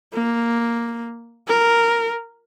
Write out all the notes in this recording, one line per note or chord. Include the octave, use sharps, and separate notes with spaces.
A#3
A#4